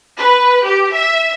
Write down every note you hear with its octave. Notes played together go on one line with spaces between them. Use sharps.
B4
G4
E5